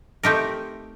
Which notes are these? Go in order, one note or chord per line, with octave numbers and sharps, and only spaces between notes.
A3 C4 D#4 G4 A#4